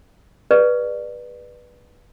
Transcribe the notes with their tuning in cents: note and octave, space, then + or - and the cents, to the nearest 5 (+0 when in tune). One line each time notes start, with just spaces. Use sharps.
G#4 +0 B4 -10 D5 +25